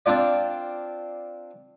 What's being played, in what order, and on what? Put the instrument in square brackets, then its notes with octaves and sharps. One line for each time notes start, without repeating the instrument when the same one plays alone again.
[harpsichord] C4 D4 F4 D5